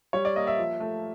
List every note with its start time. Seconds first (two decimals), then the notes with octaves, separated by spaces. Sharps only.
0.13 G3 C#5
0.25 D5
0.36 A#3 D#5
0.47 E5
0.58 F3
0.80 A3